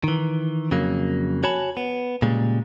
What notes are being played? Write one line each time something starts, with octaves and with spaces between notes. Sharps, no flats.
D#3 E3
F2 C#3 F#3 A#3
F#4 C#5 G#5 A5 B5
B3
A#2 C#3 G3 G#3